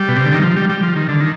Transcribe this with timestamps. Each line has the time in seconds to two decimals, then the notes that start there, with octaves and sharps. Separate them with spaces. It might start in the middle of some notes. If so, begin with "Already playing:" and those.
Already playing: G3
0.08 B2
0.16 C3
0.25 D3
0.34 D#3
0.43 F3
0.56 G3
0.69 G3
0.83 F3
0.96 D#3
1.09 D3
1.20 D#3